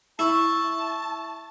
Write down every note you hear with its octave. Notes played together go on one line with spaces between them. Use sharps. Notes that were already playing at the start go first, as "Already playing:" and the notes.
E4 E5 A5 C#6 E6